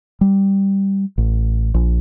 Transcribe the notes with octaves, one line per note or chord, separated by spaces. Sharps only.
G3
A1
A#1